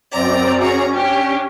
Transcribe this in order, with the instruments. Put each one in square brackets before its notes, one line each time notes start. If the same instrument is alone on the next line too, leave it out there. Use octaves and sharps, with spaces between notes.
[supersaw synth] F#2 C4 D5 [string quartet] A#5
[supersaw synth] C#4 [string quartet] F#4 G#4 A#5
[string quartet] D4 G4